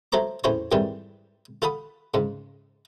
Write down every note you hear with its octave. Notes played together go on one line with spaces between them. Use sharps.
F#3 A3 C5 A#5 D6
E2 A2 C#4 E4 C5 C#5
F2 G#2 D#3 E3 G3
F4 A4 F#5 B5 D#6
G#2 C#3